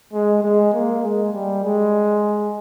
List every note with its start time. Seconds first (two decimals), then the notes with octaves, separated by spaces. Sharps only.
0.13 G#3
0.43 G#3
0.73 A#3
1.02 G#3
1.33 G3
1.64 G#3